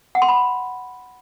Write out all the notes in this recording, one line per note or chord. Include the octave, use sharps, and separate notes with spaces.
F#5
C6
B5